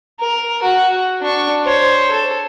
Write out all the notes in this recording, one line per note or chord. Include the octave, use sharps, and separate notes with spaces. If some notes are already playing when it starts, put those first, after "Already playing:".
A#4
F#4
D4 C#6
C5 C#5
A4